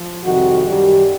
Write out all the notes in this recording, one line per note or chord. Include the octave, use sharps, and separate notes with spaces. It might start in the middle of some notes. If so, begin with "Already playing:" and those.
Already playing: F3
F2 C3 D#3 G3 F#4
F#2 D#3 G3 G4